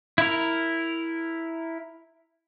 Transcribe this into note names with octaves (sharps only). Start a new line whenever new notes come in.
E4 A#4